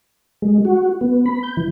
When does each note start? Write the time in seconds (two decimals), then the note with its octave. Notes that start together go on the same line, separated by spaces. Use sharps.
0.42 G#3
0.65 F#4
1.01 B3
1.26 B5
1.43 G6
1.57 E3